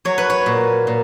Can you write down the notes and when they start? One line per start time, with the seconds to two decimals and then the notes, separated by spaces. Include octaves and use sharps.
0.05 F#3 C#5
0.18 B4
0.30 C#5
0.46 A#2
0.87 A#2